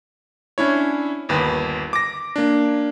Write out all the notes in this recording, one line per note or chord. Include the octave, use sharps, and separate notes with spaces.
C#4 D4 E4 C#5
G1 D#2 B4
D6 A#6
A#3 D4